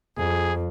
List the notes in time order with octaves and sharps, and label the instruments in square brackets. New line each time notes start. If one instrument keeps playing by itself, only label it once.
[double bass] F2 [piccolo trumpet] G#4